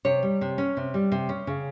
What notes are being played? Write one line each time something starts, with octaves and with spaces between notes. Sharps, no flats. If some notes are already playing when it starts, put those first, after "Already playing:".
C3 C#5
G3
C3
C#4
C3
G3
C3
C#4
C#3